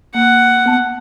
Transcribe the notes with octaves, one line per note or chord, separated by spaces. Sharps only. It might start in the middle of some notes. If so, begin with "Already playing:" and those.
A#3 F#5
B3 A5